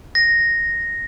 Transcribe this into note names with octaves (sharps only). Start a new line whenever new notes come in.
A#6